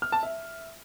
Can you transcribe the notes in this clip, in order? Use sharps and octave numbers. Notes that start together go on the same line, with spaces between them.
F6
A5
E5